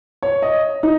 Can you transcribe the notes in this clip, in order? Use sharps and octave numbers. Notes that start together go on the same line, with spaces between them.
C#5
D#5
D#4